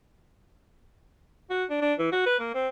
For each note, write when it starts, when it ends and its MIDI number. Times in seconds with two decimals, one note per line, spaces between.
1.50 1.64 66
1.70 1.80 62
1.81 1.93 62
1.99 2.07 52
2.12 2.24 66
2.26 2.37 71
2.39 2.55 58
2.55 2.68 60